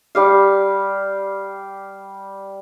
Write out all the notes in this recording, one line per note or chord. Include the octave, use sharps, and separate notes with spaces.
G3 G4 F5